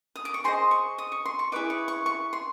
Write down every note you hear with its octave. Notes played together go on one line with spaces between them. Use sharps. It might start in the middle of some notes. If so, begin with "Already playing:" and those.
D#6
D6
C#6
G#4 C5 D#5 C6
C#6
D#6
C#6
C6
C#6
E4 G#4 B4 D#5 D6
C#6
C#6
C#6
C6